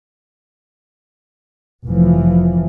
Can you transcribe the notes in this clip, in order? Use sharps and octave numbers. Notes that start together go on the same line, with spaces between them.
F1 E3 F3